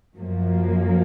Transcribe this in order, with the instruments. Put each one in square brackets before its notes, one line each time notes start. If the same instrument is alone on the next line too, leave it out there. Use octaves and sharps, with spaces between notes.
[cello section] F#2 F3 A#3